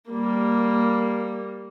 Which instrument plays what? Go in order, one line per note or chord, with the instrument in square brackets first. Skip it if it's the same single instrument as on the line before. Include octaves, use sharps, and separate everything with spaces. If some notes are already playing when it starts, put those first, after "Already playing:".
[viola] G3 A#3